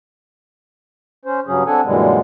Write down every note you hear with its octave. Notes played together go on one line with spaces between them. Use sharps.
C#4 C5
G2 C#3 F#3 C#4 G#4
C4 D4 A4 F#5 G#5
F#2 A#2 D3 E3 G3 G#3